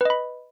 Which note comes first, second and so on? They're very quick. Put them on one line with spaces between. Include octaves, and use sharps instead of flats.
B4 D#5 B5